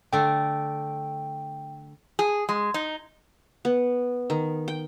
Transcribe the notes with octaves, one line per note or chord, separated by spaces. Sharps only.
D3 A3 G5
G#4
G#3
D#4
B3
D#3
G5